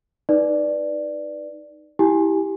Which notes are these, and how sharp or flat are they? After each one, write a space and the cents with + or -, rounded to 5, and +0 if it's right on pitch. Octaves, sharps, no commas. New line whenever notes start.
D#4 +0 B4 -5 D5 +5
E4 -15 G4 +0 G#5 +0